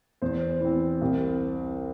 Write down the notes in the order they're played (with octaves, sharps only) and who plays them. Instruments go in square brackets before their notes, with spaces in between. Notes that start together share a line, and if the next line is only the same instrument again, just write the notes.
[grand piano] E2 C5
E3 C4
C2